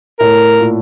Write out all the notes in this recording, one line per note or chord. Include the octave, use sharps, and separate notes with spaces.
A2 A#4
A#2